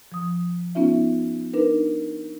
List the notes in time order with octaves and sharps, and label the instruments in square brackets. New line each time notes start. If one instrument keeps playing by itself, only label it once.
[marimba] F3 D#6
B3 C#4 D#4 F4 E5
D4 D#4 A#4 B4